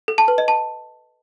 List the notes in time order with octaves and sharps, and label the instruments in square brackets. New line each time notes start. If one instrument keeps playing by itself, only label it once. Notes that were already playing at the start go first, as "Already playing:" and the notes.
[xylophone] A4
A5
B4
D#5
A5